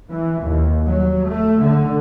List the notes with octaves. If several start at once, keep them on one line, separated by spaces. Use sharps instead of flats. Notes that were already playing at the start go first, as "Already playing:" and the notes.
E3
D#2
F#3
A3
D3